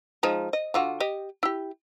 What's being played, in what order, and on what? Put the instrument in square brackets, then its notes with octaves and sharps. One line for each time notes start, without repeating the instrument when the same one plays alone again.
[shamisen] F3 G#3 D#4
D#5
D3 F4 F#4
G4 D#5
E4 G4